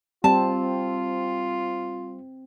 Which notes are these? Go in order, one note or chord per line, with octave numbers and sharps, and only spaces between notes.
G3 C4 F4 A5